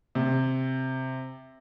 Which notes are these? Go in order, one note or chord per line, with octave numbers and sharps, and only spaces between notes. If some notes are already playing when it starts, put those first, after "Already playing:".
C3